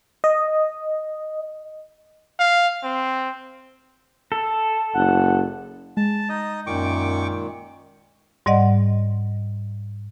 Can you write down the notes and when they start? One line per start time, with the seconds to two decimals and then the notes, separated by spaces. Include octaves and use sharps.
0.24 D#5
2.39 F5
2.83 C4
4.32 A4
4.94 F#1 F#5
5.97 G#3 A5
6.29 D#4 D#5
6.67 F#2 A#2 D#3 G5 C#6 D6
8.46 G#2 G3 D5 D#5 F#5